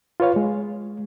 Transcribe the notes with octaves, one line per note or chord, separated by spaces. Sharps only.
F4 B4 C#5 F5
G#3